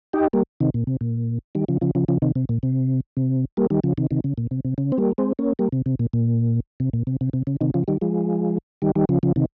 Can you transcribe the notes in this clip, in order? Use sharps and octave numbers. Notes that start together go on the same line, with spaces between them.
D#4 G4
G3 A#3
C3 D#3
A#2
C3
A#2
D#3 G3
C#3 F3
C#3 F3
C#3 F3
C#3 F3
C3 D#3
C3
A#2
C3
C3
G3 A#3
D#3 G3
C#3 F3
C3 D#3
C3 D#3
C#3
A#2
C3
C3
C#3
C4
G3 A#3
G#3 C4
A#3 C#4
G3 A#3
C3
C3
A#2
A#2
C3
A#2
C3
C3
C3
C#3
C3 D#3
C#3 F3
D#3 G3
F3 G#3
D#3 G3
D#3 G3
C#3 F3
C#3 F3
C3 D#3